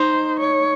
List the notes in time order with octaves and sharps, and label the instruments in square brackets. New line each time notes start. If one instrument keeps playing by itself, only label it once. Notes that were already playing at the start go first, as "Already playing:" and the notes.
Already playing: [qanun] D#4 [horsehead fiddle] C5
[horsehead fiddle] C#5